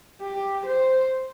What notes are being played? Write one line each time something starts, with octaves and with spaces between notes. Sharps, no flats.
G4
C5